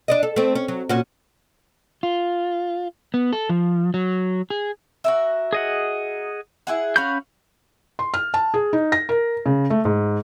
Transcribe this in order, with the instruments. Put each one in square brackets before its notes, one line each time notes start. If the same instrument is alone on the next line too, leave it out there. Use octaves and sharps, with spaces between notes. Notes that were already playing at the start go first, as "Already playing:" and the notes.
[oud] D4 D5 D#5
A4
A3 C4
C#4
F#3
A#2 C#4 F#4
[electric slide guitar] F4
B3
A4
F3
F#3
G#4
[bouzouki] F#4 A#4 E5
[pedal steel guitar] G#4 D#5 F#5
[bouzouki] E4 G#4 F#5
[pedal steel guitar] C#4 B5 G6 [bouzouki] F#4 F5
[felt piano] C6
F6
A5
G#4
D#4
A#6
A#4
C#3
A3
G#2